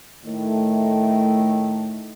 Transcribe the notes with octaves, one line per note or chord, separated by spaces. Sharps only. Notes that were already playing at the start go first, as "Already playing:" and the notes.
A2 D#3 A3